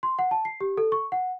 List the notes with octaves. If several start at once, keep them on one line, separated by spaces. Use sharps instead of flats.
C6
F#5
A5
C7
G4
A4
C#6
F#5